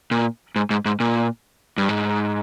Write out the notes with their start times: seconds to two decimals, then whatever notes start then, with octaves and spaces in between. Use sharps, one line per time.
0.11 A#2
0.56 G#2
0.70 G#2
0.85 G#2
1.00 A#2
1.78 G2
1.89 G#2